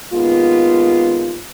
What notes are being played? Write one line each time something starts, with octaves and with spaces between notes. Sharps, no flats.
D#2 G#3 B3 F4